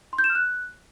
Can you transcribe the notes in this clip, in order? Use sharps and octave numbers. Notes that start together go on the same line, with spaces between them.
C6
G6
E7
F6
F#6